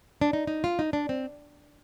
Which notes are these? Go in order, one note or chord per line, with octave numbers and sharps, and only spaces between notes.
D4
D#4
D#4
F4
D#4
D4
C4